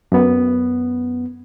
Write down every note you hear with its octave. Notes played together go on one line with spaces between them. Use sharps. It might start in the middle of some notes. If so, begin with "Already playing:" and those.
F#2 B3